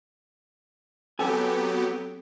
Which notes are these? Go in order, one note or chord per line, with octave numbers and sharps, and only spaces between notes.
F#3 B3 C4 G4 A4 G#5